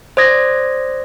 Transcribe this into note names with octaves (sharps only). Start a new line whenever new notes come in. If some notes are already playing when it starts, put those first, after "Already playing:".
C5 D5 D#6 G#6 A#6